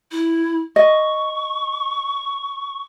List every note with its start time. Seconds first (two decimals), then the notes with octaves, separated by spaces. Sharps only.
0.12 E4
0.76 D#5 C#6